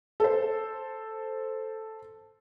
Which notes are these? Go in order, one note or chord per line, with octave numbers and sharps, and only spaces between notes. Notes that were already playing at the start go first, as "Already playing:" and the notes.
A4 C5